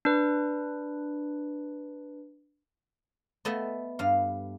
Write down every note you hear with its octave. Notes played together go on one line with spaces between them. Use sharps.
D4 B4
A3 B3 D#5 E5
G2 F5